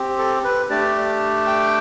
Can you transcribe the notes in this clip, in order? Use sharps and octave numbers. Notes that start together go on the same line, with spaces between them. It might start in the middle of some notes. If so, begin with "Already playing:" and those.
Already playing: C4 G4
A4
B4
A3 D4 G4 D5
G5